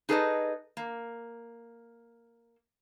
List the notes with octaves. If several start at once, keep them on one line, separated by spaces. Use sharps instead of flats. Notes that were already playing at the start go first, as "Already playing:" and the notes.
D#4 G#4 A4 B4 D5 D#5
A#3